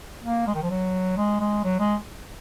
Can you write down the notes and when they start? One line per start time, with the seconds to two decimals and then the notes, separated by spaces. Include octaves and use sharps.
0.24 A#3
0.47 G#3
0.54 D#3
0.62 F3
0.70 F#3
1.17 G#3
1.40 G#3
1.64 F#3
1.79 G#3